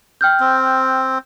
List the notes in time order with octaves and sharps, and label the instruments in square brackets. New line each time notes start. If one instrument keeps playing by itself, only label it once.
[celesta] G5 F6 G6
[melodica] C4